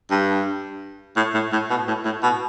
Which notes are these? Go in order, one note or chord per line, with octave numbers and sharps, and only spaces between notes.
G2
A2
A2
A2
B2
A2
A2
B2